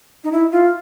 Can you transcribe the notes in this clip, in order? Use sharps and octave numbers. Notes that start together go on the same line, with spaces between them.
D#4
E4
F4